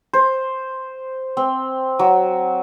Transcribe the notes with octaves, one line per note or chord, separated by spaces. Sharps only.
C5
C4
F#3